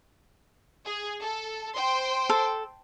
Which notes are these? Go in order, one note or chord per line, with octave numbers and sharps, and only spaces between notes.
G#4
A4
C5 G5 C6
A4